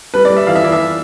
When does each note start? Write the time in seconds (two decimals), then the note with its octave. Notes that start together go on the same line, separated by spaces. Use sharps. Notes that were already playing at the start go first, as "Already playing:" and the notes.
0.14 G3 B4
0.25 D5
0.30 G3
0.37 E5
0.47 E3 F5
0.55 E5
0.64 E3 D5
0.72 E5